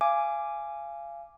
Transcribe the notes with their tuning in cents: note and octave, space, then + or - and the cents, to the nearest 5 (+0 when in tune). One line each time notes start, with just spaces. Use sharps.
F5 -30 G#5 +0 D6 +0